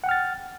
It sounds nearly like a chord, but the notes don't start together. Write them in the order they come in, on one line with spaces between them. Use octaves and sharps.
F#5 G5 F6 A6